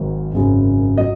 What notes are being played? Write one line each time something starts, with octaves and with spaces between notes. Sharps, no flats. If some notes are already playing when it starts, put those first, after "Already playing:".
Already playing: G#1 G#2 D#3 F#3
G#1 F#2 C#3 F#3
F#3 D#5